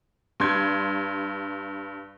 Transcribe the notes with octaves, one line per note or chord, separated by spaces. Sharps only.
G2 C6 G#6